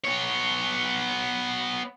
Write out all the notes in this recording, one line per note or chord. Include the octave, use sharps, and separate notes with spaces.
B3 C#5